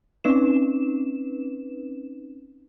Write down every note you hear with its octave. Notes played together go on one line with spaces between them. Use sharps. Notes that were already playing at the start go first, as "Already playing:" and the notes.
C4 C#4 D#4 B4 E7